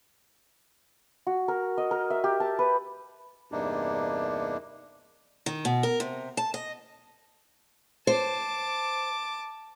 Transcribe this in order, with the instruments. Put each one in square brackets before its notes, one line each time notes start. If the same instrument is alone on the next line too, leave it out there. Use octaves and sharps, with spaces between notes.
[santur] F#4
A#4
D#5
A#4
E5
G4
A5
B4
[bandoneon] E2 G2 C3 A#3 D4 D#4
[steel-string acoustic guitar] D#3
B2
A#4
C3
A5
D#5
[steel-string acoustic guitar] C5 [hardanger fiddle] A5 D6